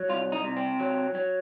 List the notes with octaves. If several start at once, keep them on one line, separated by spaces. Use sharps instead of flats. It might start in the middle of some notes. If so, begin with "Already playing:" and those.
Already playing: F#3
C2 F4
D#4
C3
C4
F#3
F#3